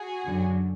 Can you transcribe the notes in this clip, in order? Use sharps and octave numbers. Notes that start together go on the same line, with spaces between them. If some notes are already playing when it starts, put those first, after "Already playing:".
Already playing: F#4 G#4
F#2 D3 F#3